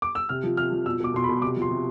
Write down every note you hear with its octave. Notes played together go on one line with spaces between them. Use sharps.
D6
E6
C3 F6
F3
C3 F6
F3
B2 E6
B2 D6
B2 C6
B5
B2
C3 D6
F3
C6
C3